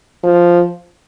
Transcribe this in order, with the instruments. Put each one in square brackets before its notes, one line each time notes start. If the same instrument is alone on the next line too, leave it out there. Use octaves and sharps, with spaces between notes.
[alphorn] F3